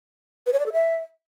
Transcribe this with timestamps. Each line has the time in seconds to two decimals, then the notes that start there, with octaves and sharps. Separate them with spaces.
0.46 B4
0.53 C#5
0.60 D5
0.66 A4
0.73 E5